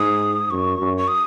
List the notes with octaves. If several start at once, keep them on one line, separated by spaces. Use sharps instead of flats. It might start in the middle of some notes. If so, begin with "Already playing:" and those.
Already playing: G#2 D#6
F#2 C#6
F#2
C#6
D#6